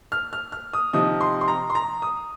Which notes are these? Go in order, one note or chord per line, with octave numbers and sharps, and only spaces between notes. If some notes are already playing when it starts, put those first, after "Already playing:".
F6
F6
F6
D#6
C3 F3 D#4 D#6
C6
C6
A#5
C6
A#5
D#6